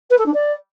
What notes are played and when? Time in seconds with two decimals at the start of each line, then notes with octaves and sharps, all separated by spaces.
0.10 B4
0.18 A4
0.26 D4
0.34 D5